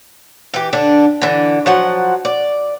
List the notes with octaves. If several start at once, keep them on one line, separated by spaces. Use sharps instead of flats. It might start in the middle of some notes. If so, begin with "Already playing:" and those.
E3 G4
D3 D4
D3 E3
F3 F#3 F#5
D5